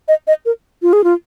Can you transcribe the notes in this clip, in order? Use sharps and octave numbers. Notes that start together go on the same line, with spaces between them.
D#5
D#5
A#4
F4
G#4
F4